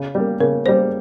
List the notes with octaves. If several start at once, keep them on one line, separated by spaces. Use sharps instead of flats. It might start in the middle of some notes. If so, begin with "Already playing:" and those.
Already playing: C#3
G3 A#3
C#3 A#4
G3 A#3 C5